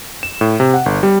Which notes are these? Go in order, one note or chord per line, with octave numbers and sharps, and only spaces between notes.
E7
A2
C3
F#5
G1
G3